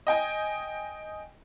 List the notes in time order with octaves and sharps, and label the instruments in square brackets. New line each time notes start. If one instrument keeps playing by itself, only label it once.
[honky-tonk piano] D#5 G5 G#5